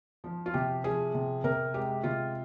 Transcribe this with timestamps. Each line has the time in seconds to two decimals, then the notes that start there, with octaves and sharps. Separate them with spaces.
0.24 F3
0.46 F4
0.54 C3 G4
0.84 F3 G#4
1.14 C3
1.44 C3 A#4
1.74 G#3 G4
2.03 C3 F4